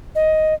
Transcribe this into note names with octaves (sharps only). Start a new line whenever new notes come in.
D#5